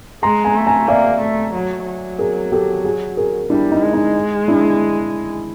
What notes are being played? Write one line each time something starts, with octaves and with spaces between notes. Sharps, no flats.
G#3 A#5 C6
G#5 A#5
A3
G#5 A#5
A#3 D5 E5
A3
F#3
F#3
G#4 A#4
G4 A4
F#4 G#4
G#4 A#4
G3 D4 E4
D#4
G#3
D#4
D4 E4